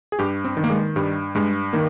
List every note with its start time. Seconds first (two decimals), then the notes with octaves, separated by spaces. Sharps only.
0.12 G#4
0.19 G2 G4
0.45 C4
0.57 D#3
0.64 A#3
0.70 G#3
0.96 G2 G3
1.35 G2 G#3
1.73 D#3 A#3